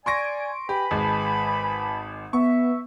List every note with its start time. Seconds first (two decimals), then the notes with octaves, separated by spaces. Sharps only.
0.06 D5 G#5 C6 C#6 A#6 D7
0.69 G4 B4 G#5 B5
0.91 G#1 G#3 A5
2.33 B3 E5 C#6